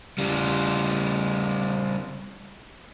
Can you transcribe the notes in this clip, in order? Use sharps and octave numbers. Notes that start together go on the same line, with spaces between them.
C#3 G3